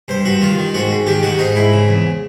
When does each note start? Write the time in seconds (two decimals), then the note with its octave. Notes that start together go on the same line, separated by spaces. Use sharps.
0.08 G2 C5
0.25 G2 F#4
0.41 D#3 F4
0.58 D#3
0.74 G#2 F#4
0.91 G#2
1.07 D#3 G4
1.23 D#3 F#4
1.39 G#2 D#4
1.55 G#2 E4
1.72 C#3
1.88 E2